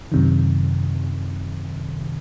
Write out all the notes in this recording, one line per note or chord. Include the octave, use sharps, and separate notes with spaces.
F#2 C3 D#3